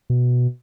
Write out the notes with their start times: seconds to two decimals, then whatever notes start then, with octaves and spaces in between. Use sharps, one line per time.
0.10 B2